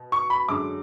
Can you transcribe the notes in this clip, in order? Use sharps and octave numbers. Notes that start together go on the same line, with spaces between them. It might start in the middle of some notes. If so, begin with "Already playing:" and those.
Already playing: B2
C#6
B5
F#2 D3 G#3 D6